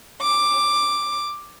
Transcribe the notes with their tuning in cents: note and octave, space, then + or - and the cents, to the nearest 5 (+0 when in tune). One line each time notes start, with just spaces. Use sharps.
D6 +5